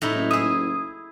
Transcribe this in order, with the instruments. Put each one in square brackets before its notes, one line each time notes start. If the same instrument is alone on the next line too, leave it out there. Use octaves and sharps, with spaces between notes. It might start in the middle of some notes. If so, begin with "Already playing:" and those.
[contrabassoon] F1 [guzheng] A2 D#4 E4
[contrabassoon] F#1
[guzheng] G#4 E5 [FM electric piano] D#6